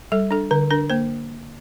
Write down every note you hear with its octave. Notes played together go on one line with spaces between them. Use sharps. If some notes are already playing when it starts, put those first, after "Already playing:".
G3 A4
D4 A4
D3 A#4
D4 A#4
A#3 C5